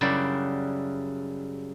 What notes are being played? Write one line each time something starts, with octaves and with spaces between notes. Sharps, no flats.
F#2 C#3 G3 E4 D5 F#5